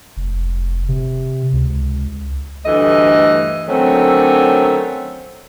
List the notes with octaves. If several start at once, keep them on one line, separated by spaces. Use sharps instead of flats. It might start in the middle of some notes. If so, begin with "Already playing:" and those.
F1
C3
C#2
D2 G2 E3 A3 D#5
D3 D#3 F#3 A3 C4 C#4